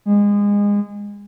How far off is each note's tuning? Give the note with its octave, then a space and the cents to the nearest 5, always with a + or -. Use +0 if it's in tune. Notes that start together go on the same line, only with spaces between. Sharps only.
G#3 -25